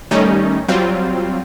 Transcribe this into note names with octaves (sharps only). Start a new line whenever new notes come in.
D#3 G3 A3 C#4 D#4
F#3 G3 C4 F4